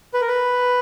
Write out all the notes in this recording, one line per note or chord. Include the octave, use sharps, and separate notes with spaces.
B4
A#4
B4